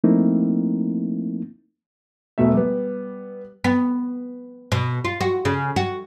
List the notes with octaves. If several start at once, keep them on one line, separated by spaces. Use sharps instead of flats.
F3 A3 A#3 C4 D#4 E4
E1 B2 A3 E5
G3 B3
B3
B2
F4
F#4
C#3
F#4